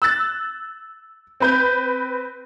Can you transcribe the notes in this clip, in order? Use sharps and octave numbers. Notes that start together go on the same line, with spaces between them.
E6 F#6 A6
C4 B4 G6